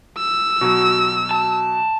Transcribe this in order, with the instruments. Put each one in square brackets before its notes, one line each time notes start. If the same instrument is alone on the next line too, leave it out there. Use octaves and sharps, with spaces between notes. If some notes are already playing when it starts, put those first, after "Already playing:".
[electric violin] E6
[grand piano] B2 F#3
[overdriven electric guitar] A5